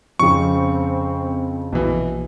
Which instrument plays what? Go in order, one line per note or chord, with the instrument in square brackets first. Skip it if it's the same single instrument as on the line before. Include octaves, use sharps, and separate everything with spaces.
[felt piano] F2 C#3 [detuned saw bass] C4 [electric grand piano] C#6
[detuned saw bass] A#1 [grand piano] B2 E3